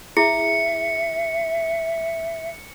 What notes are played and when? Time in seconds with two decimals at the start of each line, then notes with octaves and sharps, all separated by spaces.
0.17 E4 G#4 E5 C#7